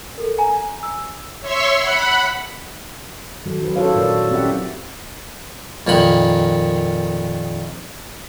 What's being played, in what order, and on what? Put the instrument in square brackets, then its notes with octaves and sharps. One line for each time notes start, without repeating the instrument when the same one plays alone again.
[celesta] A4 A#4
G#5 A#5
E6
[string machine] C#5 E5 C6 C#6 E6
F#5 B5
[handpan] D#3 F#3 A4
D#4 E4 B4 C5
E4 F#4 A4 C5 C#5 F5
A#2 F#4 A#4 D5
C4 C#4 E4 G4 E5 F#5
[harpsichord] F2 A#2 D#3 B5